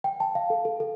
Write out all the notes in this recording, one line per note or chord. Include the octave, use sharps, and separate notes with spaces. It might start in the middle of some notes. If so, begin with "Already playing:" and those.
G5
A5
F5
A4
A4
A4